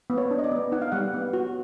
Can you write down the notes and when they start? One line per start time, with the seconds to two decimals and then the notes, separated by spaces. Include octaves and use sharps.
0.10 B3
0.18 C#5
0.31 D4
0.39 D#5
0.44 D5
0.51 B3
0.72 D#4 F#5
0.82 F5
0.92 G3 F#5
1.14 B3
1.33 F#4